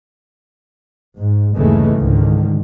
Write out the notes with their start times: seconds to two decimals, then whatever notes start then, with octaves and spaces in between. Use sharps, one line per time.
1.17 G#2
1.55 G1 D#2 C#3 E3 G#3 A3
1.96 C#2 G#2 D3 D#3